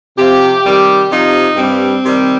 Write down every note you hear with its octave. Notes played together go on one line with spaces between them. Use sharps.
C3 F3 G4
C3 D#3 G3
C3 F3 D#4
G2 G3 C4
C3 D#3 G3